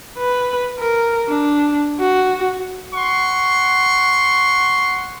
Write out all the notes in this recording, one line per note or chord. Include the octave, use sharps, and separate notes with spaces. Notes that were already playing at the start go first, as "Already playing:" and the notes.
B4
A#4
D4
F#4
F#5 C6 C#6